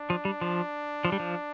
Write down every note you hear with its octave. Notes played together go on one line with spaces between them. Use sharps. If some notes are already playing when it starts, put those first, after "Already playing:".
Already playing: D4
F3
G3
F3
F3
G3
F3